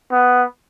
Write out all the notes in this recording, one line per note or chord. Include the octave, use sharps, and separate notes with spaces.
B3